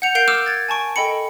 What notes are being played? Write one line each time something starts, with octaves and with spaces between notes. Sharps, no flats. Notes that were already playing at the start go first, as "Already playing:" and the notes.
F#5 G6 C#7 F7
A#4 F5 G6 C7 D7 F7
D6 E6 F6 C#7 D7 E7
G#6 A6
G#5 A5 C#6 D7
A4 D#5 G5 B5 C#7